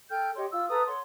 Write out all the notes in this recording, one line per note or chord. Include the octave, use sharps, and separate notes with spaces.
A4 G5 F6 G6
G4 C#5 D#5 C6
F4 E6
A4 B4 A#5 D#6
C#5 F#5 C6